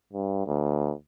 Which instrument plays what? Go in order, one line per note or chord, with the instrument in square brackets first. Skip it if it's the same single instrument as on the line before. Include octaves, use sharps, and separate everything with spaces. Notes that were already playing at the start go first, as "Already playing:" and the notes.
[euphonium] G2
D2